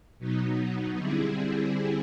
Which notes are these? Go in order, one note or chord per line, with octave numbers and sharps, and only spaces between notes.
B2 F#3 B3 D#4
D3 G3 C4 E4 G#4